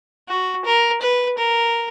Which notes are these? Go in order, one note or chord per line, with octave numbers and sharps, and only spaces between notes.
F#4
A#4
B4
A#4